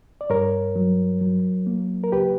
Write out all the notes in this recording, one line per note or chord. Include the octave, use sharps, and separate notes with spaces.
D5
G2 A#4 C#5
F#3
F#3
A#3
A#4
C#2 G4 B4